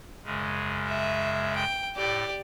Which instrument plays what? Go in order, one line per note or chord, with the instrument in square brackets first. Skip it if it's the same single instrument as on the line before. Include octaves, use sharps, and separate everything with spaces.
[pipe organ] F#2 C#3 G#3
[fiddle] E5
G5
[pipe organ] A2 [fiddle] G4 D5